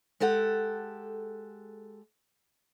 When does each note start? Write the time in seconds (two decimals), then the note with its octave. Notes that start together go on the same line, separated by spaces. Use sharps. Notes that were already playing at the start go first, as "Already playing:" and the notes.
0.20 G#3 G4 A4 F#5